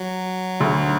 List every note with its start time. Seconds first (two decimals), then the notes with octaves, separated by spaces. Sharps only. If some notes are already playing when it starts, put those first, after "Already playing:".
Already playing: F#3
0.60 D2 D3